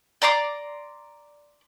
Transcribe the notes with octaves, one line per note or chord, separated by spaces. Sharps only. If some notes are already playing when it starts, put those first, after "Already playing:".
D5 A#5 C6 D6